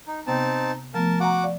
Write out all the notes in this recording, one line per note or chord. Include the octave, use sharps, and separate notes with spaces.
D#4
C3 B3 C4 D#4 G5 A5
F3 A3 B3 A#4 A5
F#4 F5 F#5 G#5 A#5 D6
D5 F5